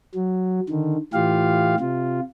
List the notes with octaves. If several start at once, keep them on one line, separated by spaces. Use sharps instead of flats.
F#3
D3 D#3
A2 E3 F4 G4 F5
C3 F4